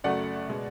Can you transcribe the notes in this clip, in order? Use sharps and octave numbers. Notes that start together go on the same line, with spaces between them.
F#2 C#3 F#3 A3 D5 F#5
B2 G#3